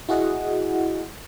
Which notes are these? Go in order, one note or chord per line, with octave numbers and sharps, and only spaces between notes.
E4 F#4 G#4 D#5 F#5